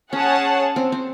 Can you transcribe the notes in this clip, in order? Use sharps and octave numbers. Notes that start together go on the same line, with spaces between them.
C#4 G#4 C#5 F#5 A5
C4
C4